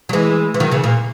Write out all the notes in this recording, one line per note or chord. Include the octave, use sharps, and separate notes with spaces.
F#3
E3 G#3
E3
D#3 F#3
C#3 E3
A#2